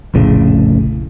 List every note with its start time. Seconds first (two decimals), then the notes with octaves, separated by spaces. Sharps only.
0.14 F1 A#1 A2 C#3